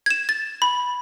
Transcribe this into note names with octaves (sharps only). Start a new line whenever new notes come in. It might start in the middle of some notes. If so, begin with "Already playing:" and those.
G#6 E7
A6
B5